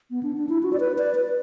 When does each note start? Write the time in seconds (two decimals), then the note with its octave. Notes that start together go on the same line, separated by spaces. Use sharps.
0.11 B3
0.23 D4
0.37 D4
0.49 E4
0.63 F#4
0.73 D5
0.80 B4
0.98 D5
1.15 B4